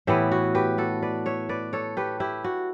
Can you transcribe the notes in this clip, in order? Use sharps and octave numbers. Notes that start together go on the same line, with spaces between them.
A2 E3 B3 E4 G4
F#4
G4 B4
F#4 A4
B4 D5
C#5 E5
B4 D5
A4 C#5
G4 B4
E4 G4
F#4